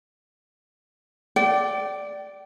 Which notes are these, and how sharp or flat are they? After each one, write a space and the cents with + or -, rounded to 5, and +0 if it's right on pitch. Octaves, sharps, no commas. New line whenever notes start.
D5 +0 G5 -35